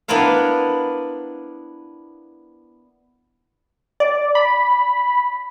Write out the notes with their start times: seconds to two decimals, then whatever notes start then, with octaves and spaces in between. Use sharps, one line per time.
0.08 B3 D4 E4 A#4 C5 F5
4.00 D5
4.35 B5